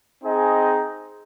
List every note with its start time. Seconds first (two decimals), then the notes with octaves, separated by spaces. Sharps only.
0.22 C4 D#4 G#4 D#5